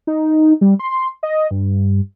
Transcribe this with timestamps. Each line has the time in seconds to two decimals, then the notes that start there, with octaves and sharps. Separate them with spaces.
0.07 D#4
0.61 G3
0.79 C6
1.23 D#5
1.51 G2